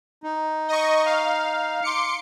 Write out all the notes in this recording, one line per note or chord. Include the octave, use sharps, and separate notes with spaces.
D#4
D#5 C#6
F5
C6 D6 C#7